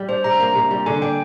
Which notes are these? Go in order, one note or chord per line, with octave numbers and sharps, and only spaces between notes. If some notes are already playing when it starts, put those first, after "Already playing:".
Already playing: G3 G4
D4 C5
C3 A#5
A#3
C3
G3
D3 G#5
D4 G5